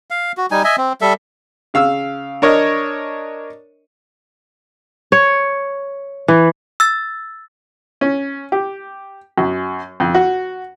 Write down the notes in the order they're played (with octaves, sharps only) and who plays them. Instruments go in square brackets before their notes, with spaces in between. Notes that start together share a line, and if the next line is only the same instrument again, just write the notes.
[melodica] F5
F#4
G3 D#4 G#5
D#5 E5 G#5
C4
G3 A4 E5
[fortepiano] C#3 F5 E6
D4 A#4 C#5 D#5
[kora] C#5
E3
[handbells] E6 A6
[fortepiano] C#4
G4
F#2
F2
F#4